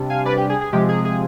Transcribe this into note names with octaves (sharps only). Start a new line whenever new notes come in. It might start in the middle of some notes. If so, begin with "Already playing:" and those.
Already playing: C3 G3 D4
F5 G#5
B4 D5
G4
G#4
G#4
C3 F3 G#3 G4
G#4
G#4